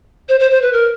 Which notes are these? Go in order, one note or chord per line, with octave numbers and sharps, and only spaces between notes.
C5
C5
C5
B4
A#4